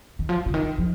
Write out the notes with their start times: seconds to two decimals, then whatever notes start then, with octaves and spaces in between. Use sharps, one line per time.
0.19 D#3
0.29 F3
0.46 C#3
0.54 D#3
0.78 F3